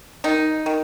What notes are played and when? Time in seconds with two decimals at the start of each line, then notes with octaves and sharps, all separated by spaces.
0.24 D#3 D#4
0.66 D#3